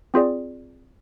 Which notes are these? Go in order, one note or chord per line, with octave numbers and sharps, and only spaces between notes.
C4 F4 G#4 D5